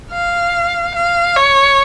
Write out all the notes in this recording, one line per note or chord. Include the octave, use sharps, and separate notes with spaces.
F5
F5
C#5